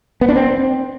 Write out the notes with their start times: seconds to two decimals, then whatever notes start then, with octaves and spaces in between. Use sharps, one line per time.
0.21 B3
0.29 D4
0.36 C4